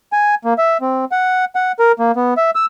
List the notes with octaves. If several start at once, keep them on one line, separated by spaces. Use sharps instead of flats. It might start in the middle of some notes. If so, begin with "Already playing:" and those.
G#5
A#3
E5
C4
F#5
F#5
A#4
A#3
B3
E5
E6